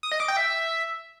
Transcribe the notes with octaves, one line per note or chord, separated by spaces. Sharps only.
D#6
D#5
D6
G5
E5